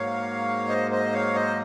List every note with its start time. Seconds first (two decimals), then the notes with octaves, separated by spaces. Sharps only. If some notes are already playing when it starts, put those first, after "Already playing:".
Already playing: G#2 F#3 A#3 C#5 F5
0.68 C5 D#5
0.91 C5 D#5
1.13 C#5 F5
1.35 C5 D#5